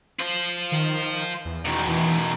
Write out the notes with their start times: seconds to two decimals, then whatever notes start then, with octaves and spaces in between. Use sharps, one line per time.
0.20 F4 C5
0.72 D#3
1.45 E2
1.65 B2 D#3
1.87 E3